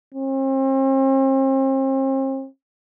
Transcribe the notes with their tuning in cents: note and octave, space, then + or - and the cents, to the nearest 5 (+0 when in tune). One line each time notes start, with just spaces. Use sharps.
C4 +40